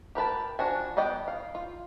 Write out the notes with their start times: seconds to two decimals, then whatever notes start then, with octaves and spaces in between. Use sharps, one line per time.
0.15 G4 A#4 B4 A5
0.59 F3 D4 F#4 G#5
0.97 B3 D5 D#5 G5
1.28 F5
1.55 F4